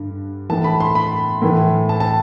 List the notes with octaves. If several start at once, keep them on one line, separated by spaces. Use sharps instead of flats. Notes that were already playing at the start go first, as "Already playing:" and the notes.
Already playing: G2 D3
A2 E3 A5
B5
C6
B5
A2 E3
A5
A5